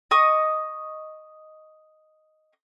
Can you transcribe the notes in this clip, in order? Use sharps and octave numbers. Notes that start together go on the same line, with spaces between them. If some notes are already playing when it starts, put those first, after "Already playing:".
D#5 C#6 D#6